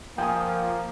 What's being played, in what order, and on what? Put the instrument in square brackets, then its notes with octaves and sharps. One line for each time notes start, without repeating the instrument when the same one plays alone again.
[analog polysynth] F3 [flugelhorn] A#3 [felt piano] G5 G#5 D#6